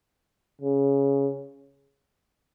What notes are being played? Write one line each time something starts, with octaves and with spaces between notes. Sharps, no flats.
C#3